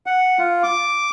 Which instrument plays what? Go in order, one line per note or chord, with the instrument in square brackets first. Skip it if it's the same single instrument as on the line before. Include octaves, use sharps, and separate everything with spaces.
[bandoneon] F#5
F4
D6